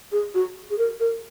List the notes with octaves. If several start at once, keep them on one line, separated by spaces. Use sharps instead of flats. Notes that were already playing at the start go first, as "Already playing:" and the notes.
G#4
F#4
G#4
A#4
A#4